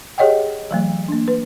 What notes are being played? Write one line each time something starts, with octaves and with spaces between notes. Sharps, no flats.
G4 G#4 C#5 D#5 F#5 G5
E3 F#3 A3
A#3 D4
B4